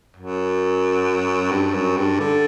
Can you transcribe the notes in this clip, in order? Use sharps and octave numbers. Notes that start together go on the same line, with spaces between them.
F#2
G2
F#2
G2
D3